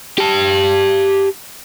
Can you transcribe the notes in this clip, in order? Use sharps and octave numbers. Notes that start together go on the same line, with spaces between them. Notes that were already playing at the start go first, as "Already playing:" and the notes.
G4 A5